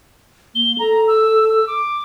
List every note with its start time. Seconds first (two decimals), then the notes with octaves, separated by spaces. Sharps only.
0.55 A#3 G7
0.79 A4 A#5
1.07 E6
1.50 E6
1.67 D6